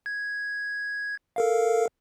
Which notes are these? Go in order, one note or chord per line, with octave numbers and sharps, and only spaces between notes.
G#6
A4 A#4 F5